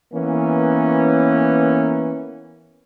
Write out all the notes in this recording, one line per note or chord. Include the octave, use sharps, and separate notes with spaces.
E3 A#3 B3 C#4